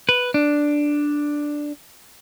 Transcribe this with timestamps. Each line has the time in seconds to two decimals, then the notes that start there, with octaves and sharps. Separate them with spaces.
0.09 B4
0.34 D4